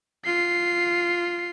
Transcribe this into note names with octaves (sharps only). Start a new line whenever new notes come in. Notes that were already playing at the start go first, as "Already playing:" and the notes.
F4 C7